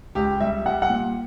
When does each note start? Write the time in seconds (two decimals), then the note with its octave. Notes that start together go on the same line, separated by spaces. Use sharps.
0.15 C#2 G4
0.41 G3 E5
0.66 G3 F#5
0.82 F#5
0.90 A#2